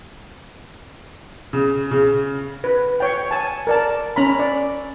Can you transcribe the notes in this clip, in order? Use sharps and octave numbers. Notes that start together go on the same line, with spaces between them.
C#3
C#3
B4
C#5 G5
G#5 A5
A#4 D5 A5
C#4 A#5 B5
D5